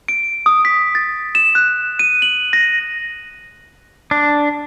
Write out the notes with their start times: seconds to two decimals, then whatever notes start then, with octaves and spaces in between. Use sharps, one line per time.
0.08 D7
0.46 D#6
0.65 B6
0.95 A6
1.35 E7
1.55 F#6
1.99 D#7
2.22 F#7
2.53 A#6
4.11 D4